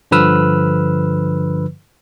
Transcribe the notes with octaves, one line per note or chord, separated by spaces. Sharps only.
G2 D3 F3 B4 E6 F6